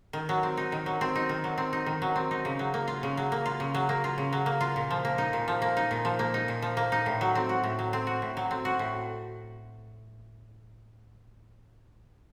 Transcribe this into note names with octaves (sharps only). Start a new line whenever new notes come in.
D#3
F#3
C4
D#4
D#3
F#3
C4
D#4
D#3
F#3
C4
D#4
D#3
F#3
C4
D#4
C#3
F#3
A#3
F4
C#3
F#3
A#3
F4
C#3
F#3
A#3
F4
C#3
F#3
A#3
F4
A#2
F3
A#3
D#4
A#2
F3
A#3
D#4
A#2
F3
A#3
D#4
A#2
F3
A#3
D#4
A2
F#3
C4
F#4
A2
F#3
C4
F#4
A2
F#3
C4
F#4
A2